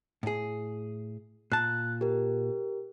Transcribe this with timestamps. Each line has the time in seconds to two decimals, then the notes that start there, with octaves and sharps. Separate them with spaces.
0.23 A2 G#4
1.52 A#2 A5 F#6
2.01 G4 A#4